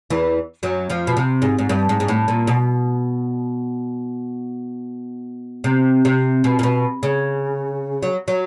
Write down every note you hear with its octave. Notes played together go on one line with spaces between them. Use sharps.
E2 E3
F#2 F#3
F2 F3
B2
C3
G#2
G#2
G2
G#2
G#2
A2
A#2
B2
C3
C3
B2
A#2
B2
C#3
F#3
F#3